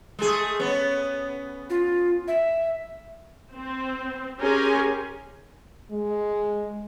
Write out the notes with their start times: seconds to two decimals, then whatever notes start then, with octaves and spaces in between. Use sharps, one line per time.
0.19 G#3 A3 G#4
0.60 B3 C#4
1.70 F4
2.28 E5
3.53 C4
4.39 C#4 G4 G#4 A#4 G#5 C6
5.91 G#3